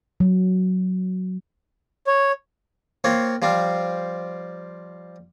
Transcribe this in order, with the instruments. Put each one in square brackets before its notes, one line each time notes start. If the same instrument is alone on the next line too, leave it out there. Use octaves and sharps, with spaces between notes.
[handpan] F#3
[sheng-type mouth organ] C#5
[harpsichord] A#3 C4 F4 C#5
F3 G3 C4 F4